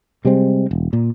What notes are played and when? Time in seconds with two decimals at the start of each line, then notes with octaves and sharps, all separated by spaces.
0.25 C3 G3 G#3 C4
0.71 E1
0.93 A#2